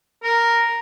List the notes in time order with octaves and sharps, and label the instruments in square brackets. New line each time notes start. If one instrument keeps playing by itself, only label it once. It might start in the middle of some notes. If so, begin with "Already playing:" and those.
[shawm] A#4 [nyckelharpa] A#5